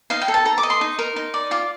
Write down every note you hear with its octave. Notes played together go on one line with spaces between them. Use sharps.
D#4 F5
G5
A4
A5
A4 A#5
D6
D#5
C6
D#4
A#4
D#4
D5
F4 D6